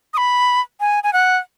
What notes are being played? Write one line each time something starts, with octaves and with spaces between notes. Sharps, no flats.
D#6
B5
G#5
G#5
F#5